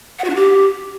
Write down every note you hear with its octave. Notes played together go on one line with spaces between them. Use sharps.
F#5
F#4
D4
G4